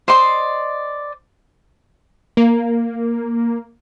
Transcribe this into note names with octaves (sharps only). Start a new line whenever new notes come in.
C5 D5 D#5 C6
A#3